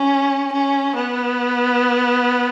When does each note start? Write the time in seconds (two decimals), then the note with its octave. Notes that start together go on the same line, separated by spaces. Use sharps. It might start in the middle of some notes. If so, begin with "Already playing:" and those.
Already playing: C#4
0.53 C#4
0.96 B3